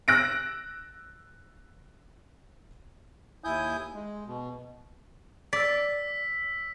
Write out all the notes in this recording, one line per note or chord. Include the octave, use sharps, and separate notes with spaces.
E6 F#6 A#6 D7
D#2 E4 G#5 D#6 G6
G#3
B2
D5 E6 B6